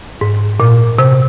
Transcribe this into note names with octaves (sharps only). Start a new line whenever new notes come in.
G#2
A#2
C3